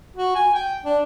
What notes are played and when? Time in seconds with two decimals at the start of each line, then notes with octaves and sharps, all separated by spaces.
0.17 F#4
0.35 G#5
0.55 G5
0.85 D4